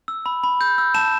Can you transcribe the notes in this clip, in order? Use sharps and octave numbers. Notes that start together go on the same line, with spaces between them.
E6
B5
B5
G6
E6
A5 E7